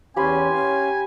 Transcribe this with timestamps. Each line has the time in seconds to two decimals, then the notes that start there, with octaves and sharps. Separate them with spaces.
0.16 E2 C#4 G4 G#5 B5 C6
0.53 C#4 F5